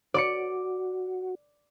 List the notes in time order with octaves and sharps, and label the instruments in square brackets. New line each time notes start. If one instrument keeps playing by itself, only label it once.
[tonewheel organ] F#4 [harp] D5 D6 C#7